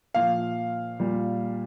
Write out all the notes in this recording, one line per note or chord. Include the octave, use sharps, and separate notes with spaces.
A#2 F3 F5
A#2 G3